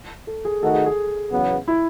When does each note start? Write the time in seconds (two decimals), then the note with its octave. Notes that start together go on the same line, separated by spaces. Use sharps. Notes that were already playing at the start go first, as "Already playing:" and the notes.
0.27 A4
0.45 G#4
0.63 D#3 A3 D#4 F#4 A4
0.74 G#4
0.86 G#4
1.32 E2 C#3 F#3 B3
1.68 E4